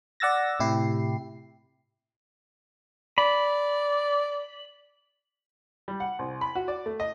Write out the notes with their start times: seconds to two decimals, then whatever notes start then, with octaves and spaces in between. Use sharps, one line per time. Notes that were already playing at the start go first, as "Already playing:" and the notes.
0.20 D5 F#5 E6 A6 A#6
0.60 A2 C3 E4 G4 C7
3.18 D5 B5
5.88 G3
6.00 F#5
6.19 C2
6.41 B5
6.55 F#4
6.68 D5
6.86 A3
7.00 D#5